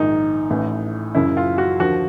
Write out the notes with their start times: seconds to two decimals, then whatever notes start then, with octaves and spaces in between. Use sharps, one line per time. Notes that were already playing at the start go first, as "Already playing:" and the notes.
Already playing: A#1 G#2 D#3 D#4
0.50 A1 A2 E3
1.14 F#1 F#2 C#3 E4
1.37 F4
1.58 F#4
1.80 D#2 D3 F3 F#4